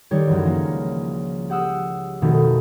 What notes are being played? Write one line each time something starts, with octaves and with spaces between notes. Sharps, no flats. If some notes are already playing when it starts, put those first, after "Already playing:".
D#3 G3 G4 C#5
C#2 F#2 E3
F3 A#3 C#4
G4 F#5 D#6 E6
F2 B2 D#3 A3